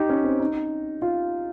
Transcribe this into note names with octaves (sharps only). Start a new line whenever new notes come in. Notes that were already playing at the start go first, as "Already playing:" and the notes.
Already playing: D#4 G4
C#4
C4
D#4
F4